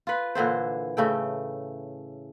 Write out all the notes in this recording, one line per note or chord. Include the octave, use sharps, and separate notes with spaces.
F4 B4
A#2 D3 E3 C5
A2 C#3 A3 G5